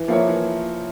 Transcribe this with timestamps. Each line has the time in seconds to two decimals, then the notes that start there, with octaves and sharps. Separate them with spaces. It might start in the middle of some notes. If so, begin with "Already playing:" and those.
Already playing: E3
0.08 F3 A#3 E4 A#4 C#5
0.27 E3